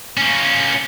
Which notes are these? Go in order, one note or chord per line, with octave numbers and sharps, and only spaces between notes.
A#3 C#4